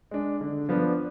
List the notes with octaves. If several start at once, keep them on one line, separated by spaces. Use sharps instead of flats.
G#3 D4
D3
F3 B3 D4